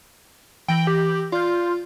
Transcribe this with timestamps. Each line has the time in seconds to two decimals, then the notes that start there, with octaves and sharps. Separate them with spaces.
0.68 E3 G5 A#6 F#7
0.87 G4
1.32 F4 D5 G6